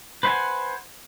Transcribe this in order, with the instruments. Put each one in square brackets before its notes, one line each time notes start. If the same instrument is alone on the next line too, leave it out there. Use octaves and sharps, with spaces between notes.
[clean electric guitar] B4 C5 E5 F#5 G#5